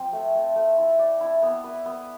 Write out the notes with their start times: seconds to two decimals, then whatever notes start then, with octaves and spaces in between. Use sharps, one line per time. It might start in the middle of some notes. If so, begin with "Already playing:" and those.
Already playing: F3 C4
0.13 A3
0.35 A3
0.56 A3
0.78 E4
0.99 D5
1.21 E4
1.42 B3
1.64 B4
1.86 B3